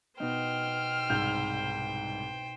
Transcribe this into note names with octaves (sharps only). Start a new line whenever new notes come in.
B2 D#4 C5 G5 F6
C2 G#2 G6